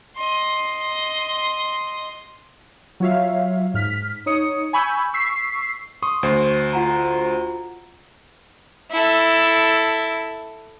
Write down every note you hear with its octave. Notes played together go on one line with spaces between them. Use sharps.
D#5 C6
F#3 F4 C#5 E5 F5
G#2 F6 B6
D#4 C#5 D#6 C#7
G#5 B5 C#6 E6 G6
C#6 E6 B6 C7
C6 C#6 D#6
D2 C5 C6
F4 F#5 A#5
E4 A4